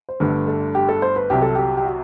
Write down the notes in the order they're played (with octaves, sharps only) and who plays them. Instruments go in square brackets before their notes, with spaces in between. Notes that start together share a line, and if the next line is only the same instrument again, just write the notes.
[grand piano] C5
[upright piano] G1 G2 D3 A3 [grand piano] B4
[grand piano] A4
G4
A4
C5
B4
[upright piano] C2 C3 F#3 [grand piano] G4
[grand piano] A4
G4
G4
F#4